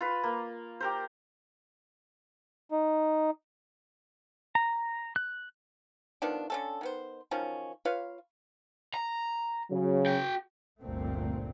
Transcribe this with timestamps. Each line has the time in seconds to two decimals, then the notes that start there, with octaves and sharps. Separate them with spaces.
0.01 F4 B4
0.24 A#3
0.80 G4 A#4 C5
2.72 D#4
4.55 A#5
5.16 F#6
6.22 D#3 F3 B3 D4
6.50 D3 C#4 A4
6.81 D#3 B3 C5
7.31 D#3 F3 F#3 C#4
7.85 F4 B4 C#5 F5
8.94 A#5
9.70 C#3 F#3
10.06 F#4 G5
10.80 G1 D2 A#2 A3 C4